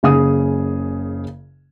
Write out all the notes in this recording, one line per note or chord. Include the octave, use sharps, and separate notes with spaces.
F#1 C#3 G#4 D#6